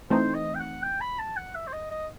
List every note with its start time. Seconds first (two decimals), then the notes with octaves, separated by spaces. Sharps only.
0.10 E3 A3 C4 D#4 C5
0.34 D#5
0.55 G5
0.59 F#5
0.83 G5
1.01 B5
1.19 A5
1.37 F#5
1.55 E5
1.67 C5
1.73 D#5
1.91 D#5